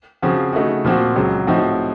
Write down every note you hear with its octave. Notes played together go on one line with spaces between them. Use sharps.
C#3 F3 C4 F#4
C#3 A3 D#4 F#4
A#2 F3 C4 F#4
C#2 C#3 F#3
A2 F3 C4 D#4 F#4